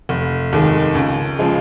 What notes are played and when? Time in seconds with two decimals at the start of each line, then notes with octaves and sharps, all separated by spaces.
0.09 F1
0.53 D#2 D#3 G#3
0.95 C#2
1.39 C#3 F3 G#3